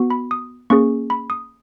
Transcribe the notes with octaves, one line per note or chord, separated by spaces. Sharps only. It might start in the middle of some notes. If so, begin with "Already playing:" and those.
Already playing: B3 F#4
B5
D#6
A#3 C#4 G#4 C#6
B5
D#6